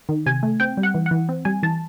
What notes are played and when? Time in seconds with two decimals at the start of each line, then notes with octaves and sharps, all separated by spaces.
0.09 D#3
0.26 C3 G#5
0.43 A3
0.60 C4 G5
0.77 G3
0.83 F#5
0.94 E3
1.06 E3 F#5
1.29 C4
1.45 G3 G#5
1.63 E3 A5